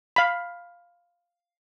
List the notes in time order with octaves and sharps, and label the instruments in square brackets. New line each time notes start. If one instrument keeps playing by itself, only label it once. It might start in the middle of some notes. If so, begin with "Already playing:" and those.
[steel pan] F5 B5